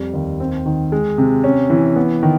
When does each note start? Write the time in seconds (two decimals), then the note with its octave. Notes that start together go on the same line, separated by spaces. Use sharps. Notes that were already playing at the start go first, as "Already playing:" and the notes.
Already playing: F2 G3
0.14 D#2
0.40 C4
0.66 D#3
0.92 G#3
1.18 C3
1.44 C#4
1.70 E3
1.96 B3
2.23 D#3